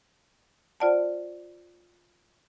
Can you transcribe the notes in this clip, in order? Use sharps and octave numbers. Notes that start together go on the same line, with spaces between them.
F4 C5 D5 F#5 A5